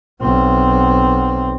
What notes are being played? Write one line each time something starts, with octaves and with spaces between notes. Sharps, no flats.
B1 C4